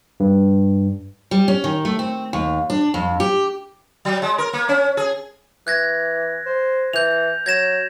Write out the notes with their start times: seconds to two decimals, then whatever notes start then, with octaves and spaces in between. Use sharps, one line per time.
0.20 G2
1.31 G3
1.48 C#4
1.64 D#3
1.85 A3
1.99 C4
2.33 D#2
2.70 D4
2.94 F2
3.20 G4
4.05 F#3
4.22 G#3
4.38 A#4
4.53 A#3
4.69 C#4
4.97 G#4
5.67 E3 F#6 G#6 A#6
6.46 C5
6.93 E3 G6 F7
7.46 F#3 G#6 A#6 E7